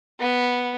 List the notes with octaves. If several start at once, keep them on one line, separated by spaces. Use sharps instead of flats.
B3